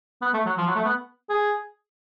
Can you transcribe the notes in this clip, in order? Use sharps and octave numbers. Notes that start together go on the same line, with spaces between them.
B3
A3
F#3
F3
F#3
A3
B3
G#4